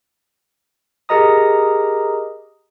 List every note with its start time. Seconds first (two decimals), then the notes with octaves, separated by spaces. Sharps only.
1.09 G4 G#4 A#4 D#5 A#5 D#6